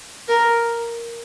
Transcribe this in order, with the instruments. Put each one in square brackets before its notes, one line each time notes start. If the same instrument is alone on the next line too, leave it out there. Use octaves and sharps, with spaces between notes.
[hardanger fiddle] A#4